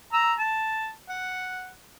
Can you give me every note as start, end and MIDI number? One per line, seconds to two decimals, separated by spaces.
0.13 0.34 82
0.13 0.34 88
0.39 0.90 81
1.09 1.73 78